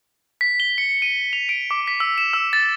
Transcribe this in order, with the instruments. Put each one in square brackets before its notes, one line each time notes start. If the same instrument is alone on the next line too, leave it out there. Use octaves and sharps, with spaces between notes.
[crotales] B6
G7
C#7
D#7
F7
D7
D6
B6
E6
E7
E6
A6